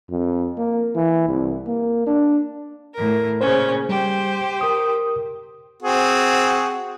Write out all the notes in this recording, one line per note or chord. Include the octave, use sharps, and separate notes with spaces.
F2
A#3
E3
C2
A#3
D4
A2 A#4
A#2 C#3 C#4 C5
G3 G4 C5
A#4 D#6
C4 F#4 G#4